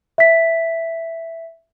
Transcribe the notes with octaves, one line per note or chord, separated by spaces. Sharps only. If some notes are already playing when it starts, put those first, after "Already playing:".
E5 B6